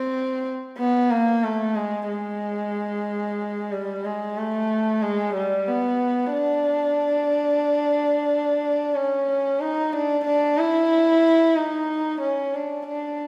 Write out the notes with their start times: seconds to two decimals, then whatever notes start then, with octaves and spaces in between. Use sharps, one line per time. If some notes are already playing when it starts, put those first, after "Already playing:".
Already playing: C4
0.78 B3
1.10 A#3
1.44 A3
1.76 G#3
2.09 G#3
3.72 G3
4.05 G#3
4.38 A3
5.02 G#3
5.35 G3
5.68 B3
6.33 D4
8.95 C#4
9.60 D#4
9.93 D4
10.25 D4
10.57 E4
11.56 D#4
12.21 C#4
12.54 D4
12.87 D4